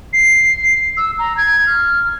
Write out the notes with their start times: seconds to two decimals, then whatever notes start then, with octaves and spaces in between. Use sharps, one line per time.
0.13 C7
0.97 E6
1.19 A#5
1.37 G#6
1.67 F6